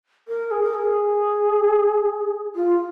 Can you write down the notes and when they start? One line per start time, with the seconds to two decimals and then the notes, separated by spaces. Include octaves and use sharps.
0.28 A#4
0.51 G#4
0.63 A#4
0.74 G#4
2.55 F4